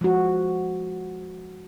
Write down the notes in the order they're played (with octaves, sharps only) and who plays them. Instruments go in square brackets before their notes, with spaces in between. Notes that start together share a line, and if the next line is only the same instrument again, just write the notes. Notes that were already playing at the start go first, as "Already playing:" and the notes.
[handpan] F3 G#3 F#4